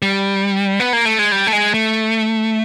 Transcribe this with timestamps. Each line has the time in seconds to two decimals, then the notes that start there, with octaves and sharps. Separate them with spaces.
0.02 G3
0.80 B3
0.93 A#3
1.05 A3
1.19 G#3
1.32 G3
1.47 A3
1.53 G#3
1.74 A3